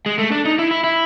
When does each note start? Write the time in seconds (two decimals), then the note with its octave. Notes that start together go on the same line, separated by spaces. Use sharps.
0.06 G#3
0.19 A3
0.31 D4
0.45 D#4
0.59 E4
0.71 E4
0.84 E4